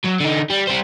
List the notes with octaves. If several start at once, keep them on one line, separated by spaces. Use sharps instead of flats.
F#3
D3 D#4
G3
G3 C5